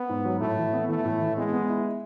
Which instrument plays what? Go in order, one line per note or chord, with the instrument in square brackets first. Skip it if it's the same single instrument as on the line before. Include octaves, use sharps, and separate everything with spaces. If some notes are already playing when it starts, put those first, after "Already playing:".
Already playing: [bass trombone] B3
[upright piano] G#2
F#3
[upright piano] A2 [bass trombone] A3
[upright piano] E3
B3
[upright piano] E3 [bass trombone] A3
[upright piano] A2
E3
[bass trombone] G#3 [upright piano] B3
[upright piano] B3
E4